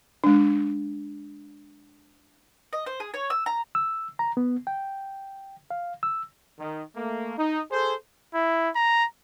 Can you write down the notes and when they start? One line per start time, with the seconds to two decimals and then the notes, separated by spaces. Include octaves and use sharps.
0.24 G#3 D4
2.73 D#5
2.86 C5
3.00 G#4
3.14 C#5
3.30 E6
3.46 A#5
3.75 E6
4.19 A#5
4.37 B3
4.67 G5
5.71 F5
6.03 E6
6.59 D#3
6.96 A3 A#3
7.38 D#4
7.71 G#4 A4 C5
8.35 E4
8.75 A#5